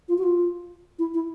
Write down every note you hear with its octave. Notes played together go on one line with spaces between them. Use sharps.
F4
F#4
F4
E4
E4